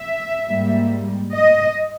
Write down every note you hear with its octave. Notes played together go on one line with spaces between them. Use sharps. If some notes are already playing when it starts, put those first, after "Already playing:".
Already playing: E5
G#2 G3 A#3
D#5